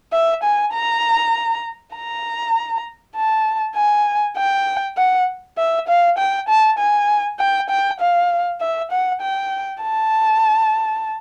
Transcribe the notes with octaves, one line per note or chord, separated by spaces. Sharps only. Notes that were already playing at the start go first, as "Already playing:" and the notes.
E5
G#5
A#5
A#5
A5
G#5
G5
F#5
E5
F5
G5
A5
G#5
G5
G5
F5
E5
F#5
G5
A5